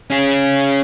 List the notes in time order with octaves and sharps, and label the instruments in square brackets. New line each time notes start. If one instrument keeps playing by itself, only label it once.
[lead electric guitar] C#4 G#4